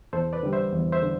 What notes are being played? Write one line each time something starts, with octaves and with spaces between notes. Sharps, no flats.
E2 A4 C5
B4 D5
D3 G3
C5 E5
E2
C5 E5
D3